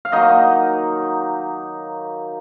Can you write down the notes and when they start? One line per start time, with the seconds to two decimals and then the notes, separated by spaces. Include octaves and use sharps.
0.05 F5
0.12 D#3 F#3 A#3 D#4 D#5